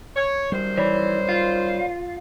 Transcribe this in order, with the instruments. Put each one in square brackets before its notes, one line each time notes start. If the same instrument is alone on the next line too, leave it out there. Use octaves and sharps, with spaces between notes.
[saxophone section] C#5
[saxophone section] F#2 D#3 C5 [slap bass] G3
[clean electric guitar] E3 [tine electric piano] C#5 D5 B5
[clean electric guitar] F4